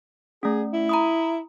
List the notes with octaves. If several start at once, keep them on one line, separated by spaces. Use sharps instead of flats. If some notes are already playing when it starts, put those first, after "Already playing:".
A3 C#4 G#4
E4
A#5 B5 D#6